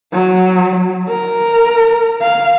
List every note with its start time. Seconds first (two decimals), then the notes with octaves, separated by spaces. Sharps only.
0.13 F#3
1.09 A#4
2.21 F5